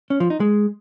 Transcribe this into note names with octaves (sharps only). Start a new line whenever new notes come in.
C#4
F3
D#4
G#3